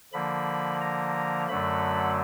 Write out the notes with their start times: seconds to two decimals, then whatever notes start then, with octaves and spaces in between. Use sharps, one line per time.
0.13 D3 F3 A#3 B5
0.81 A#5
1.48 F#2 D3 F#3 A3 B5